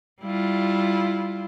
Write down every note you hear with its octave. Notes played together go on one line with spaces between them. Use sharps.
G3 E4 F4